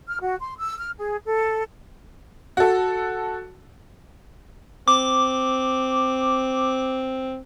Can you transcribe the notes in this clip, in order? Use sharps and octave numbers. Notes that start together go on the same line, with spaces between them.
F6
F#4
C6
E6
F6
G#4
A4
F#4 A4
C4 D6